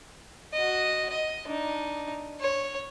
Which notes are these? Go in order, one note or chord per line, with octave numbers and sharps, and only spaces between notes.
F#4 D#5
D#5
D4 D#4
C#5